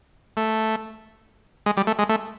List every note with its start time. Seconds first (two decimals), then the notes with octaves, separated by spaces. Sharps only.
0.37 A3
1.66 G#3
1.77 G3
1.87 A3
1.99 G#3
2.09 A3